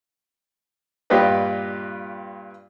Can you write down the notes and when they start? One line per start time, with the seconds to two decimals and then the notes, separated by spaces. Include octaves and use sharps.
1.10 G2 A#2 F4 G4 B4 D#5